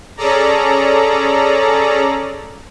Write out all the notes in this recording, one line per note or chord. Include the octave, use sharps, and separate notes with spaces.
C#4 G#4 A4 D5 A#5